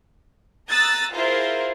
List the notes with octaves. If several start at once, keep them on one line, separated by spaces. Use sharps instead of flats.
A#5 D#6 E6 F#6 A6
E4 F4 G#4 A#4 C5